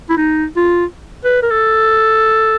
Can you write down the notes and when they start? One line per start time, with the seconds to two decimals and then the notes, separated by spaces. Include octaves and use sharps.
0.09 E4
0.17 D#4
0.57 F4
1.25 B4
1.42 A#4
1.50 A4